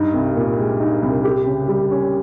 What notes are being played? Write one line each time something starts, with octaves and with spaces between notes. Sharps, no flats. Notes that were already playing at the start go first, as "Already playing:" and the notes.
Already playing: G2 D#4
C2
A#2
G#3
D#4
C2
G4
C#3
G3
C#4